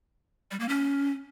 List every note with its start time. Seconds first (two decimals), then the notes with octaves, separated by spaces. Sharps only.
0.51 G3
0.60 A#3
0.69 C#4